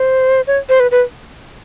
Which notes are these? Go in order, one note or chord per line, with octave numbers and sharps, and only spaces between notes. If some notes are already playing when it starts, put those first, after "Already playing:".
Already playing: C5
C#5
C5
B4
B4